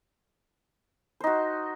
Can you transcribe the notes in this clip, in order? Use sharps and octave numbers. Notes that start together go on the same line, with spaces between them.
D#4 F#4 C5